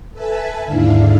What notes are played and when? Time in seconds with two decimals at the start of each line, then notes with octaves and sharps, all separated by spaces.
0.12 A4 B4 E5 G#5 A5 B5
0.64 D#2 G#2 D3 D4 E4 F5